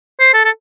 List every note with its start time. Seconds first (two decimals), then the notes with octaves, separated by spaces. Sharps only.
0.20 C5
0.34 A4
0.45 A4